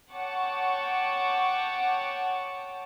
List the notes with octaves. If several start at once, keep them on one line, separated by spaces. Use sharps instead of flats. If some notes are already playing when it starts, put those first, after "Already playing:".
C#5 F#5 G5 A5 C#6 D6